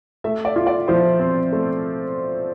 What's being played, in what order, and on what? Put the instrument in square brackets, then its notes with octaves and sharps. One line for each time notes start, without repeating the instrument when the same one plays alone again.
[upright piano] A3 [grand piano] E5
[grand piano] D5
[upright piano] F4
[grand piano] D5
[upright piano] F3 [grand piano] C5
[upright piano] C4
A3